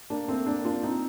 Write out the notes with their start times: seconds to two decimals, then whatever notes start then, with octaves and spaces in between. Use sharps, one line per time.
0.10 A#3 D4
0.28 A3 C4
0.46 A#3 D4
0.65 D4 F4
0.83 C4 D#4